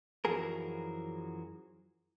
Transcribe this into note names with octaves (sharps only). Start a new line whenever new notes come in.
F#2 E3 F3 F#4 G#4 A#4